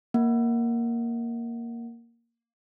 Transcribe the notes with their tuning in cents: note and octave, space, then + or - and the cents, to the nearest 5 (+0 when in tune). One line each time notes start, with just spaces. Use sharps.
A#3 +0 F#5 +0